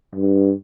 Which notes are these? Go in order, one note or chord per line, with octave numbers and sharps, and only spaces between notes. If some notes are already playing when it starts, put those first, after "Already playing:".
G2